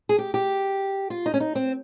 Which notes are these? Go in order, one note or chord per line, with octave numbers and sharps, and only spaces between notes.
G#4
G4
G4
F4
D#4
C#4
D#4
C4